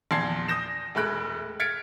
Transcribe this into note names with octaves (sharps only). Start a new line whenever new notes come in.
A#1 E2 A5 C6 G#6 C7
D#6 G6 A#6 E7
E1 G#3 A3 B5 F#6 D7
F6 G#6 A6 B6 C#7 D7